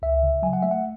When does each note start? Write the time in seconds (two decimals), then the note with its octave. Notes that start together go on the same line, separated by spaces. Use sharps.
0.02 C#2 E5
0.23 C#3
0.43 F#3 G#5
0.53 F#5
0.62 A3 E5
0.71 F#5